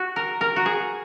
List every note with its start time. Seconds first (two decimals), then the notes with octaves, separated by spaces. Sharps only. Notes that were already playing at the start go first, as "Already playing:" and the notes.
Already playing: F#4
0.16 A#4
0.41 A#4
0.56 F#4
0.66 G#4